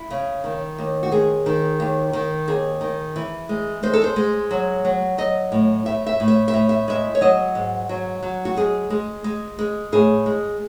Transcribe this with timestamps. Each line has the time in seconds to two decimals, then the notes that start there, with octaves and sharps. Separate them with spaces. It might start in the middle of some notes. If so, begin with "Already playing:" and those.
Already playing: E4
0.10 C#3
0.44 D#3
0.78 D#2
1.03 F#4
1.11 G#3 G#4
1.46 D#3
1.80 D#2
2.13 D#3
2.48 D#2 G#4
2.81 D#3
3.16 E3
3.49 G#3
3.83 G#3 C5
3.93 A4
4.04 C5
4.16 G#3
4.51 F#3
4.85 F#3
5.18 F#3 D#5
5.52 A2
5.86 A2 E5
6.06 E5
6.20 A2
6.28 E5
6.48 E5
6.54 A2
6.69 E5
6.88 G#3 E5
7.15 C#5
7.21 F#3 D#5
7.55 G#2
7.89 F#3
8.22 F#3
8.45 F#4
8.56 G#3 G#4
8.90 G#3
9.24 G#3
9.59 G#3
9.92 A2 G#4
10.26 G#3